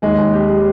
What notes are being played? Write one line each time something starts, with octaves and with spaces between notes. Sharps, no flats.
D#2 G#3 G#4
D#2
G3 G4
G3